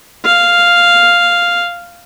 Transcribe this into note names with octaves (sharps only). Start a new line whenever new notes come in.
F5